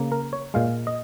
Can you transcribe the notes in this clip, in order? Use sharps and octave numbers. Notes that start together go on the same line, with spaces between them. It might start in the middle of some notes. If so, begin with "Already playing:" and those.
Already playing: C#3 A#3
A#4
C#5
A#2 G#3 F5
D#5